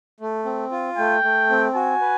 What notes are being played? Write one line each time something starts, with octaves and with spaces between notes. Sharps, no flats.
A3
C4
F4
A3 G5
A3
C4
F#4 G#5
B4